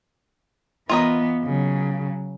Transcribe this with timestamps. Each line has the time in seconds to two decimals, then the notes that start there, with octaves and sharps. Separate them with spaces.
0.90 E3 B3 F4 A#4 D#5
1.44 C#3 F#3